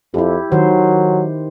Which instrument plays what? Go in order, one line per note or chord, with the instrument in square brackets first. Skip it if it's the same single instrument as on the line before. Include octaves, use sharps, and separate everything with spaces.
[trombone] F2 [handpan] E4 G4
[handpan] D#3 C5 [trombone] F#3